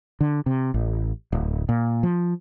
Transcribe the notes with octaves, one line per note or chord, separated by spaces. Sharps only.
D3
C3
A1
D1
A#2
F3